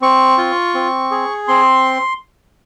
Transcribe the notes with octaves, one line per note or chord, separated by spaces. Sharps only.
C4 C#6
F4
C4
G#4
C4 C6